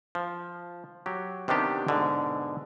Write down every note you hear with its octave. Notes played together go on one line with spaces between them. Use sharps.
F3
F#3 G4
C3 D#3 B3 D4 G4
G#2 B2 D3